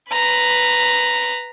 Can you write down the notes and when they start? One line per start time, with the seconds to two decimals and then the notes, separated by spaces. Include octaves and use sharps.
0.12 B4 A#5